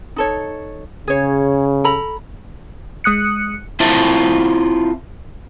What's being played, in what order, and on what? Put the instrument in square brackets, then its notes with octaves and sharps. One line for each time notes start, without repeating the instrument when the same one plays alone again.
[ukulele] D#4 A4 C#5
[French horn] C#3 [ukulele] G#4 C#5
[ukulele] A4 A#5 B5
[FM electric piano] G#3 D#6 F#6 C#7
[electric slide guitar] C4 E4 F4 C5 E5 A5